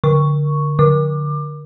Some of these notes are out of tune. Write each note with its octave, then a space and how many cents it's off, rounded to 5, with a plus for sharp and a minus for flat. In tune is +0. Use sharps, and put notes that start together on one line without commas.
D3 -10 C#6 +0
D3 +0 D6 +20